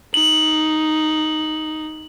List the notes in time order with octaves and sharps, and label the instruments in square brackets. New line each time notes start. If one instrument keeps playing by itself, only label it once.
[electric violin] D#4 [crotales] F#7